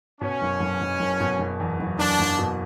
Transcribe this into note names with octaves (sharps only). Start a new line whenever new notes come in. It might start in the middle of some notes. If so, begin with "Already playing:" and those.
B2 C#4
F#1
F#1
F#1
F#1
B2
F#1
E2
F#1
F#1 D4
F#1
B2